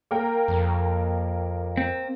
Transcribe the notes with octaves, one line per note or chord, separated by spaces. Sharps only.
A#3 A#4 G5
F2
C4